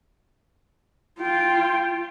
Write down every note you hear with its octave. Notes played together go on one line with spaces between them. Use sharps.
F4 G5